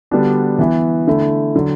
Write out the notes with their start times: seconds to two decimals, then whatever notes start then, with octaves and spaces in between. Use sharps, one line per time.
0.11 D3 G3 B3 D4 F#4
0.59 E3 B3 E4
1.07 D3 A3 E4
1.56 D3 F#3